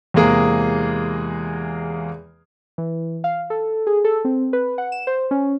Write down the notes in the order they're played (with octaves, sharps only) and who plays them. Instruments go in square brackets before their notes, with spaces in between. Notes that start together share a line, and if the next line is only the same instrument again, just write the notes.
[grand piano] E2 C3 G#3 A#3 G#4 A#5
[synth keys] E3
F5
A4
G#4
A4
C4
B4
F#5
E7
C5
C#4